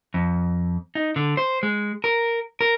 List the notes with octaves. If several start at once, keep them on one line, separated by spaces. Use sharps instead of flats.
F2
D#4
D3
C5
G#3
A#4
A#4